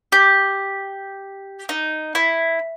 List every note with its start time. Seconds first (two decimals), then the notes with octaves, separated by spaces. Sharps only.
0.12 G4
1.69 D#4
2.15 E4